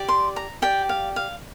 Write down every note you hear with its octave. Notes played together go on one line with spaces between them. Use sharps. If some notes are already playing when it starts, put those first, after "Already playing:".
Already playing: G4 D5
C6
A#5
G4 D5 G5
F5
F5